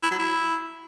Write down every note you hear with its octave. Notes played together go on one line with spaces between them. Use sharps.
E4
F#3
E4